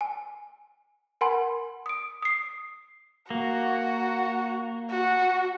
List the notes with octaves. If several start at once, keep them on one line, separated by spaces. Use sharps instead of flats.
G#5
A#4 F#5 G#5 B5 C6
D#6 D7
D#6 C7
A#3 F#4
F#4